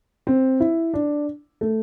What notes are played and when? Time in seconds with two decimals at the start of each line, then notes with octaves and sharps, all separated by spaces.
0.27 C4
0.60 E4
0.94 D4
1.61 A3